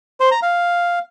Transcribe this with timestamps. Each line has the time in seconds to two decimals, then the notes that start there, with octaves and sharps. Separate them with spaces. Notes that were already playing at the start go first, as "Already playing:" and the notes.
0.20 C5
0.31 A#5
0.42 F5